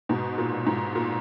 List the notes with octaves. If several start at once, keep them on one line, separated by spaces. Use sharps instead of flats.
G#2 B2
A#2
G#2
A#2